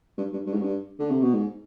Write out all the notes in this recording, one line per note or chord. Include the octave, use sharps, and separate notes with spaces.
G2
G2
G2
G#2
G2
D3
C3
B2
G#2